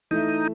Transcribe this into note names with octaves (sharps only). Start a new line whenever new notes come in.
E3 A3 D#4 E4 A4 E5